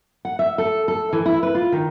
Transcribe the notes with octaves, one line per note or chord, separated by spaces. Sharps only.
F#5
E5
A4
A4
E3
E4
B4
F4
D#3